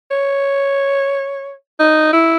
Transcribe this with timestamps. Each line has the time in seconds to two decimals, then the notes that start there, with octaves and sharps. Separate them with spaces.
0.11 C#5
1.79 D#4
2.13 E4